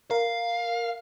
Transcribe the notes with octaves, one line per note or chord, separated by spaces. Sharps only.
A#4 F5